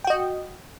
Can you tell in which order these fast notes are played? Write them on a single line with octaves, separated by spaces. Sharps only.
G5 F#4 D#5